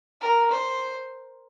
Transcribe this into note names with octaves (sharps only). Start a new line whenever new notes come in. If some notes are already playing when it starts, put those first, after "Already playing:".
A#4
C5